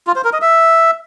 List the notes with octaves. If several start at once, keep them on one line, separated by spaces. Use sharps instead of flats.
F4
C5
A#4
D#5
E5